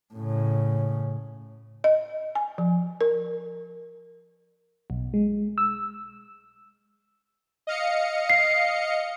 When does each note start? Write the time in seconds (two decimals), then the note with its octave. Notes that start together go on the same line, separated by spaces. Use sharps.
0.14 A2 C#3
1.84 D#5
2.35 G#5
2.58 F3
3.01 A#4
4.90 B1
5.14 G#3
5.58 E6
7.67 D#5 F5 C#7
8.30 C7